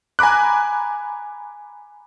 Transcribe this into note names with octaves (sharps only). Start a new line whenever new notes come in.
G#5 A#5 B5 D6 F#6